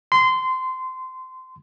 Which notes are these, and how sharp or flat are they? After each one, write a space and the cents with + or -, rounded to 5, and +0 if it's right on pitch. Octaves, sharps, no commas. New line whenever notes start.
C6 -20